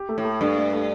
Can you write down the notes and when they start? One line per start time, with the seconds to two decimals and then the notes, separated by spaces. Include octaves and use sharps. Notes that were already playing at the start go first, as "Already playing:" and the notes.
Already playing: G4
0.09 A3
0.18 A2
0.25 A3
0.41 G2 A3
0.57 A3
0.72 A3